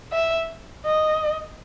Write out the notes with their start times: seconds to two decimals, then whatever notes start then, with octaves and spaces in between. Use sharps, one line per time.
0.12 E5
0.85 D#5